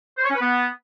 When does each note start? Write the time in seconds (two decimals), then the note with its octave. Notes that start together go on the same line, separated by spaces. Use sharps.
0.18 C5
0.24 C#5
0.29 C#4
0.35 B4
0.40 B3